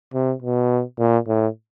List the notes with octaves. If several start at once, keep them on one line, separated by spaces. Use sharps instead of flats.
C3
B2
A#2
A2